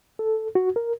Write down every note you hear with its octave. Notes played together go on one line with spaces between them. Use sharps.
A4
F#4
A#4